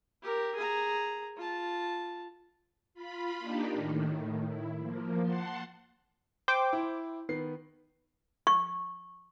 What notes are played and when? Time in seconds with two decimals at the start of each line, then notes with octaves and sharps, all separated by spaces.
0.22 G4 A#4
0.55 G#4 A#5
1.37 F4 A5
2.94 F4 B5
3.39 A#3 D4 D#4 G4
3.73 A2 D#3
4.45 E4
4.79 F3 A#3
5.22 F#5 A5 C6
6.48 C5 G5 D6
6.73 E4
7.29 D#3 B3 C7
8.47 C#6